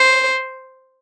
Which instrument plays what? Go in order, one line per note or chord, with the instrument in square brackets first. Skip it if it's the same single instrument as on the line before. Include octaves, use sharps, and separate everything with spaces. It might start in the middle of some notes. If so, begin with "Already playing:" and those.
Already playing: [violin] C5